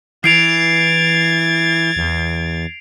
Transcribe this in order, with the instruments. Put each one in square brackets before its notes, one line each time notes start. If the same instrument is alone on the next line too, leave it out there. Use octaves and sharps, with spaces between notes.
[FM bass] E3 [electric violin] G#6 A6 [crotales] C7 D7 F7
[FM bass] E2